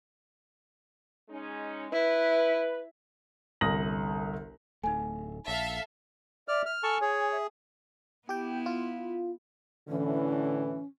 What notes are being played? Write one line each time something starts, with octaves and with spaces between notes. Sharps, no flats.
G#3 C#4 D#4
E4 B4
G1 C2 D#6 A#6 F#7
D1 A3 D#4 G#5
A#1 A4 E5 F5
D5 E5 F6
F6
A4 G#5 A5 C#6
G#4 C#5
E5
B3 E4 G4 G5
F4
A2 D3 E3 C#4